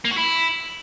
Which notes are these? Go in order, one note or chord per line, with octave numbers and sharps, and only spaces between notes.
A#3
F#4
E4